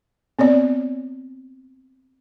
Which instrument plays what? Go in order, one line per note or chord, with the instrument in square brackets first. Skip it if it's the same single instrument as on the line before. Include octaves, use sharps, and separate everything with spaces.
[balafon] B3 C4 C#5 D5